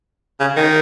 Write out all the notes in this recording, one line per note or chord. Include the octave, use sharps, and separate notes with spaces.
C#3
D#3